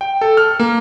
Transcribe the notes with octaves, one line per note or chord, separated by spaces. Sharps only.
G5
A4
F6
A#3